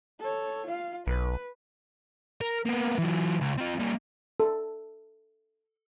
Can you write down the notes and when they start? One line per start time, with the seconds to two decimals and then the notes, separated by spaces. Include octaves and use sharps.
0.20 A4 C#5
0.67 F4 F5
1.07 B1 B4
2.41 A#4
2.66 A#3 B3
2.98 E3 F#3
3.40 C#2
3.57 C4 F4
3.79 G3 A#3
4.40 A4